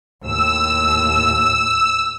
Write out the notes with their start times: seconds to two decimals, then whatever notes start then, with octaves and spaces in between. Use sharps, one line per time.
0.22 D#2 A2 E6